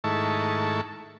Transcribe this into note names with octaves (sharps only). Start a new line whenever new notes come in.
G#2 D#3 A3 E4 A5 C#6